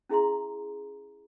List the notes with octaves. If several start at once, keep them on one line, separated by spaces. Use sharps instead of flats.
C#4 E4 G#4 E5 A#5 C6